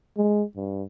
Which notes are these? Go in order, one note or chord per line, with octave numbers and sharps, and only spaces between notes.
G#3
G2